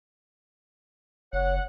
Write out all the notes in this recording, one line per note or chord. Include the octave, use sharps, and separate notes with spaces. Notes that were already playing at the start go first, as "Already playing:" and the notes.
F#1 C#5 F#5